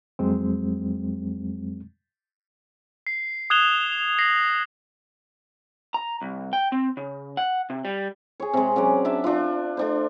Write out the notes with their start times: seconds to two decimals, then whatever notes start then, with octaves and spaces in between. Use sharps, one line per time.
0.19 F2 F#3 G#3 C4
3.07 C7
3.50 D#6 F#6 G#6 E7 F7 G7
4.19 A#6 C7 F7 F#7
5.94 A#5
6.21 C2
6.53 G5
6.72 C4
6.97 C#3
7.37 F#5
7.70 C3
7.85 G3
8.40 G#4 C#5
8.53 C3 G#3
8.76 F#3 C#4 G#4 D5
9.05 D4 D5 E5 A5
9.24 D4 F4
9.77 A3 D4 C5